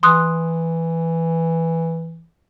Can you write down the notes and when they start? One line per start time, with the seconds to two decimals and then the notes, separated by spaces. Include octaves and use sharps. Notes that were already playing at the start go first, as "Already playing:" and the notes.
0.03 E3 C6 D#6 F#6